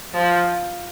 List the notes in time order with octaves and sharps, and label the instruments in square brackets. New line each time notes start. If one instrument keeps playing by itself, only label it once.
[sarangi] F3